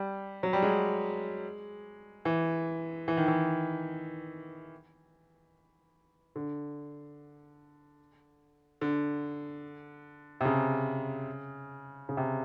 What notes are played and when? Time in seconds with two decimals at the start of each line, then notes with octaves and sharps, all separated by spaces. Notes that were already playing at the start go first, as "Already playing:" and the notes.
Already playing: G3
0.43 F#3
0.53 G3
0.62 G#3
2.25 E3
3.08 E3
3.17 D#3
3.28 E3
6.36 D3
8.81 D3
10.41 C3
10.45 C#3
12.09 C#3
12.17 C3